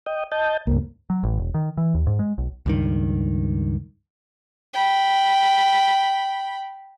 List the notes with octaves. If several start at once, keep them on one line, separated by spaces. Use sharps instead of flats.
D#5 G5
D#5 A5 G6
C#2 G2 A#3
F#3
A1
E1
D#3
E3
D#2
G#2
G#3
B1
C#2 G2 D#3
G5 B5